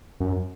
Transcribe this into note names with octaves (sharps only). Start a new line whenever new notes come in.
F#2